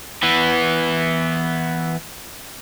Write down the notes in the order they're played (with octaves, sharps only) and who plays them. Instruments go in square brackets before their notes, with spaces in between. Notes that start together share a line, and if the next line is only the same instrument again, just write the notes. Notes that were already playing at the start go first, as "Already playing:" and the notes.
[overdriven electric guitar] E3 B3